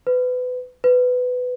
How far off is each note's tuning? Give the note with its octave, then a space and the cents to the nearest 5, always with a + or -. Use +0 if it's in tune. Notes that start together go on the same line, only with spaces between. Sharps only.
B4 +25
B4 +15